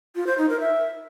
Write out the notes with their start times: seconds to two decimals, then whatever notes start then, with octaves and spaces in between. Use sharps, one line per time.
0.16 F4
0.27 C5
0.38 D#4
0.49 A#4
0.60 E5